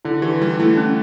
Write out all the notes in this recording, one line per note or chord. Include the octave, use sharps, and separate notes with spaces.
D3 E4
E3 G4
G3 E4
A3 E4
C#4